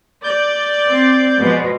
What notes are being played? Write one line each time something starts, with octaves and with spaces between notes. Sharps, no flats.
D5 G6
C4
B2 F3 G#3